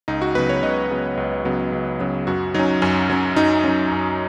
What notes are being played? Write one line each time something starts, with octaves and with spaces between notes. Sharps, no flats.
C#2 D#4
F#4
C#3 F#3 B3 B4
C#5
C#2 D#5
C#3 F#3 B3
C#2
C#3 F#3 B3
C#2
C#3 F#3 B3
F#2 F#4
F#3 C#4 D#4
F#2 C#4
F#3 C#4
F#2 D#4
F#3 C#4
F#2